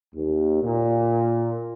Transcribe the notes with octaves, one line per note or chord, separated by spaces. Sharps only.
D#2
A#2